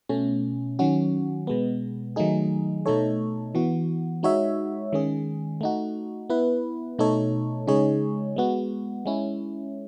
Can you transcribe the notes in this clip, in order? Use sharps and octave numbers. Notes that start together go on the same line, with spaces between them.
B2 A3 C#4
D#3 F#3 C#4 F#4
B2 G#3 B3
D#3 F#3 A3 D#4 G#4
B2 A3 D#4 A4 C#5
E3 B3 F#4
G#3 D#4 F#4 C#5 E5
D#3 G#3 C#4 G#4
A3 D#4 F#4
B3 E4 B4
B2 A3 D#4 A4 C#5
C#3 G#3 D#4 G#4 C#5
G#3 B3 F#4
G#3 C#4 E4